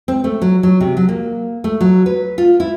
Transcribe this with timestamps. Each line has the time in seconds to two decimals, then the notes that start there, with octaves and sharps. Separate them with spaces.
0.08 C4
0.24 A3
0.42 F#3
0.63 F#3
0.81 C3
0.97 F#3
1.09 A#3
1.64 A3
1.81 F#3
2.06 B4
2.38 F4
2.60 E4